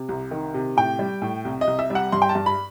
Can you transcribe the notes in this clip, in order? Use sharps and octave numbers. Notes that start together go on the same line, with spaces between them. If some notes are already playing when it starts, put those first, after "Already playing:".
Already playing: C3
C2
D#3
C3
A2 G5
G3
A2
C2
D#5
C2
E5
G3
F#5
G2 C6
G5
A5
G2
B5